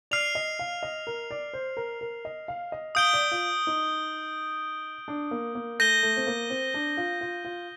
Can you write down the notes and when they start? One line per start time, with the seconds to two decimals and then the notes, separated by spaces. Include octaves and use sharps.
0.11 D5 F6 C7 F7
0.35 D#5
0.59 F5
0.83 D#5
1.07 A#4
1.31 D5
1.53 C5
1.77 A#4
2.01 A#4
2.25 D#5
2.48 F5
2.72 D#5
2.95 F5 D#6 G6 D7 G7
3.13 D5
3.32 F4
3.67 D#4
5.08 D4
5.31 A#3
5.55 A#3
5.79 A3 G6 A#6 D#7 G7
6.03 A3
6.17 C4
6.27 A#3
6.50 C4
6.74 D4
6.97 F4
7.21 F4
7.45 F4